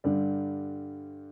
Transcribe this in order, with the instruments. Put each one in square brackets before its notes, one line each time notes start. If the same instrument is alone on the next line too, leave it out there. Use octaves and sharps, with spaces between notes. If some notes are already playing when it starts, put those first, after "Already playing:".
[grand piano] G2 D3 G3